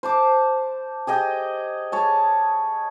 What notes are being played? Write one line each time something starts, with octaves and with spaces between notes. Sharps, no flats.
C5 A5 D6
G4 G#4 D#5 G5
G#4 C#5 A5